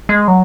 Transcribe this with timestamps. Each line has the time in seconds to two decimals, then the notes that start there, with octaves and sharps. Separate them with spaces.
0.09 G#3
0.28 F#3